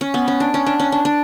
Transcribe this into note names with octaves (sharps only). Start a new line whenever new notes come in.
C#4
B3
C#4
D4
C#4
D4
C#4
D4
D4